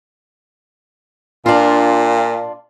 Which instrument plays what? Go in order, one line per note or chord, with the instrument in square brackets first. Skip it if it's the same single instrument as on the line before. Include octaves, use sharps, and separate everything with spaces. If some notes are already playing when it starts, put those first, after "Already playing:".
[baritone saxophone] A#2 [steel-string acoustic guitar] D4 F4